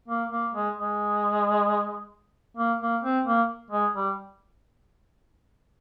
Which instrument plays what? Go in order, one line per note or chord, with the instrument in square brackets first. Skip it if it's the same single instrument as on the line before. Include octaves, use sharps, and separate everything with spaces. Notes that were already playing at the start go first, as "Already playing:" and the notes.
[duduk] A#3
A#3
G#3
G#3
A#3
A#3
C4
A#3
G#3
G3